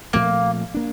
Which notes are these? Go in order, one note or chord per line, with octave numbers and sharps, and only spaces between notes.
A#2 F3 A3 A#3 C4
A#3 D4